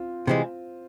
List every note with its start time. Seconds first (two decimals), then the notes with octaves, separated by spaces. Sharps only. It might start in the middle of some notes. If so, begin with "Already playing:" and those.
Already playing: C4 F4
0.27 C3 E3 G#3